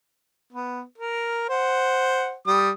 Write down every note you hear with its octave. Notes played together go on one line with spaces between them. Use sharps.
B3
A#4
C5 F#5
G3 D#6